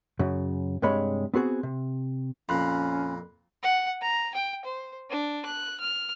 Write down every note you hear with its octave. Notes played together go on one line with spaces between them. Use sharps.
F#2 C#3
G2 C3 G#3 C#5 B5
B3 C4 F#4 G#4
C3
F2 A#2 C#4 B5 C6 F#6
F#5
A#5
G5
C5
D4
F#6
F6